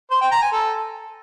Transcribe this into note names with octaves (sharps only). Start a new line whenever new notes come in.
C5
G5
A#5
G#5
A4